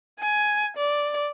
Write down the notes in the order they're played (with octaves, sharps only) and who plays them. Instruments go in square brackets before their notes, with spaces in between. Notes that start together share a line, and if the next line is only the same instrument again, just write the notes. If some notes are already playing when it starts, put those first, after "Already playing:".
[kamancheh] G#5
D5